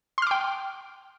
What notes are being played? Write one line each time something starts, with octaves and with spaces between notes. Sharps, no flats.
G5 C6 D6 F6